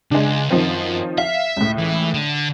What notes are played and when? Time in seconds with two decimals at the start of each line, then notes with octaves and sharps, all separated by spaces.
0.11 C#2 G#3 D4
0.50 F#2 D#3 F3 C4
1.18 E5 F5
1.57 C#2 A2
1.78 E3
2.14 D3